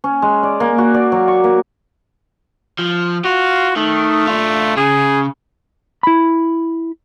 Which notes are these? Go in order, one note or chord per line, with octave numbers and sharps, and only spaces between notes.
C#4
G#3
D5
A#3
F#4
D5
F#3
C#6
A#3
F3
F4 F#4
D#3 A3
D4 F4
C#3 G#4
E4 B5